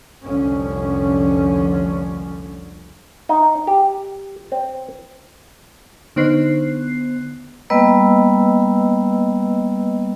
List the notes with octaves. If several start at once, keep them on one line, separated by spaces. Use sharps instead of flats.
F1 C2 D3 F3 C#4
D#4
G4
C4
D3 B3 D#4 C5 F#6 C7
G3 A#3 B3 B4 D#5 E6